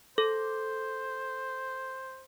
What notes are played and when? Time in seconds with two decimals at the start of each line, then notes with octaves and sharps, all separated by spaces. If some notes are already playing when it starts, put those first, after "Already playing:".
0.18 A4 C5